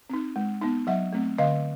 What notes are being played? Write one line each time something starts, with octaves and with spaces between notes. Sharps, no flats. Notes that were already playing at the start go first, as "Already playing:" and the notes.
C4 D#4
G#3
B3 D#4
F#3 E5 F#5
A3 C4
D3 D#5 F5